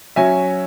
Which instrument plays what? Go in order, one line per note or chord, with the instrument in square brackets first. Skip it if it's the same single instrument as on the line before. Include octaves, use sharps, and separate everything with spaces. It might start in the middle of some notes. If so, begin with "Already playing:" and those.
[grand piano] F#3 C#4 E5 G#5